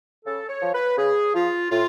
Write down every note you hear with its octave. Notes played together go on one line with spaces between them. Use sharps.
C#3 A4
C#5
F3
B4
C#3 G#4
F3 F4
A2 F4